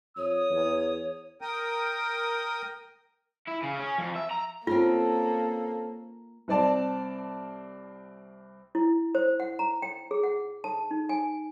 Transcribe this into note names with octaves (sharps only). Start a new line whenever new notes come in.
F2 C#5 D#6
E2
A#4 G5 D#6
E4
C#3
C#4
F2
E5
A#5
A#3 C4 C#4 F4 A4 A#4
C2 C4 D5 A5
E4
C5
F#5
A#5
G5
G#4
F#5
A5
D#4
G#5